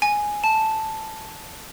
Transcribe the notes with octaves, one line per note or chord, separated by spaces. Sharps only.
G#5
A5